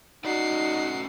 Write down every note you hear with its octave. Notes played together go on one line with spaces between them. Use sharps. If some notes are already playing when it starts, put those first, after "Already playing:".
A3 C#4 D#4 F#4 D5 C7